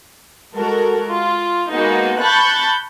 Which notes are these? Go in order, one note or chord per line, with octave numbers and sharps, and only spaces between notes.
G#3 F#4 A4 A#4
F4
G#3 A#3 B3 D#4 F#4
A5 B5 C#6 F#6 G6 A6